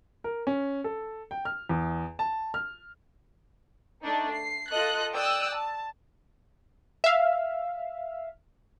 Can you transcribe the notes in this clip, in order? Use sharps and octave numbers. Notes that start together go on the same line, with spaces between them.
A#4
C#4
A4
G5
F6
E2
A5
F6
A3 D4 D#4
C7
F4 A4 D#5 F#6
D5 G5 D#6 E6 F#6
A5
E5 F5